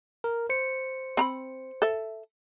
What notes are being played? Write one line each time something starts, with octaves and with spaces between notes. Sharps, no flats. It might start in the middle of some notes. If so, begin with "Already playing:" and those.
A#4
C5 C#7
C4 A#5 B5
A4 E5